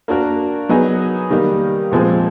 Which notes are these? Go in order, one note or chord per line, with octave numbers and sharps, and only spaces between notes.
A#3 D4 F#4 A#4
F#3 B3 D#4 G#4
D#3 G3 A#3 D#4
A#2 F3 G#3 C4